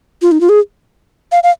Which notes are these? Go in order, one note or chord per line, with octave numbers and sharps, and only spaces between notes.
F4
D#4
F4
G#4
F5
F5